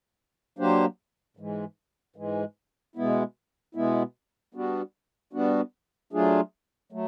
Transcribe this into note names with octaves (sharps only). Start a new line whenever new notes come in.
F#3 A#3 D4 G4 C5
G#2 E3 G#3
G#2 E3 G#3
B2 G#3 B3 E4
B2 G#3 B3 E4
G3 B3 D4 F#4
G3 B3 D4 F#4
F#3 A3 D4 F4 G#4
F#3 A3